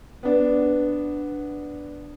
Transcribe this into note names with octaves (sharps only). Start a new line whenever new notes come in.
B3 D4